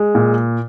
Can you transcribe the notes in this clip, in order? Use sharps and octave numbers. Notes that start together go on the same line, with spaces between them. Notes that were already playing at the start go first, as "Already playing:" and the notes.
Already playing: G#3
A#2